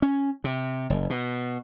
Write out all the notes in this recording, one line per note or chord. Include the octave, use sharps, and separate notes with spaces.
C#4
C3
F#1
B2